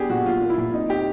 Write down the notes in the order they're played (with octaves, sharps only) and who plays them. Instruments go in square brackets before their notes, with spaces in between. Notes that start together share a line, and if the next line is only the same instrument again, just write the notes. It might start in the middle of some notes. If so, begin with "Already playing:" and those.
Already playing: [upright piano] B3 D4 G4 G#4
A#2 F#4
F#3 F4
A#3
E4
A#2
C4 D#4
C4 G4